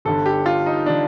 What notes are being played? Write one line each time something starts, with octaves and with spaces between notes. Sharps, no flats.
G1 G2 D3 A4
G4
F4
D#4
D3 D4